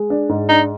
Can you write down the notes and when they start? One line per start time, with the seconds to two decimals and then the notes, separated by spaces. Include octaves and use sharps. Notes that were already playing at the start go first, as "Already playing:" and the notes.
Already playing: G#3
0.10 D4
0.29 G#2
0.49 D4 D#4